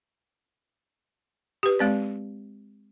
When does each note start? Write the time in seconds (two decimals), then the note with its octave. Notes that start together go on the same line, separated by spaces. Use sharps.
1.63 G4 B4
1.79 G#3 C4 D5